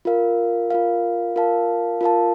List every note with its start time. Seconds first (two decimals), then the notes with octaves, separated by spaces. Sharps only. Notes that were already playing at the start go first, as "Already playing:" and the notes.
0.05 F4 A#4 F5
0.70 F4 A#4 F5
1.36 F4 A#4 F5 A5
2.01 F4 A#4 F5 A5